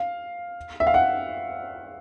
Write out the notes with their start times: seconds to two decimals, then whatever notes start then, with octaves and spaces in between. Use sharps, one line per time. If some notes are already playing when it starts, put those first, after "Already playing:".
Already playing: F5
0.80 E5
0.87 F5
0.94 F#5